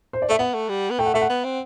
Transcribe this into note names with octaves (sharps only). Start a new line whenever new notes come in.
C5
D5
A3 E5
B3 F#5
A3
G3
B3
A3 G5
F#5
A3 E5
F#5
B3
C4